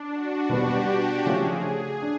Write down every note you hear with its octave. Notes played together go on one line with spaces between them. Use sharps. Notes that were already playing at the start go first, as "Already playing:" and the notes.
Already playing: D4
F#4
B2 G3 B3 G4
C#3 F3 A3 C#4 F4 G#4
D4